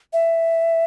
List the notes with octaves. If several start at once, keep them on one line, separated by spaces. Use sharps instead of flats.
E5